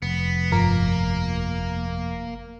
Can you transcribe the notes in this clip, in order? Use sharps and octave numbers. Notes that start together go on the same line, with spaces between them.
F1 B3
G1 F3 A#3 A#4